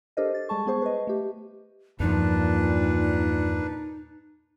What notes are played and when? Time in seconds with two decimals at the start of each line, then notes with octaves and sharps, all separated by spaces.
0.17 D4 G4 A4 A#4 C5 D#5
0.34 A6
0.49 G3 G#3 G#4 A5 C#6
0.67 B3 G#4 C5 C#6
0.82 B4 D#5
1.07 A3 G4
2.00 E2 G2 A#2 F3 D4 D#4 B4